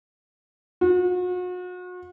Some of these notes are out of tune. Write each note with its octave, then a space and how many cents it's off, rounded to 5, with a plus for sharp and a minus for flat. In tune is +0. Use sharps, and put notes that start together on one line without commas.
F#4 -40